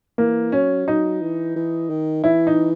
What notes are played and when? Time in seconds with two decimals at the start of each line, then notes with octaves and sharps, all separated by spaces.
0.18 E3 A#3
0.52 F#3 C#4
0.87 F#3 D#4
1.21 E3
1.56 E3
1.90 D#3
2.24 E3 E4
2.47 D#4